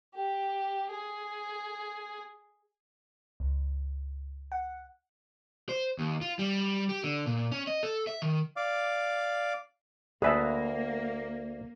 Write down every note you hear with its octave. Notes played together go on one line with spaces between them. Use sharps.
G4
G#4
C#2
F#5
C5
D#2
F4
G3
G4
D3
A#2
C#4
D#5
A4
E5
D#3
D5 F5 D6
D2 A#3 G#4 B4 E5 A5